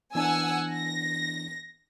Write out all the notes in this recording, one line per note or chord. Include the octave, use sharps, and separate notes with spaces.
E3 B3 D4 F#5 G#5 E6
A#6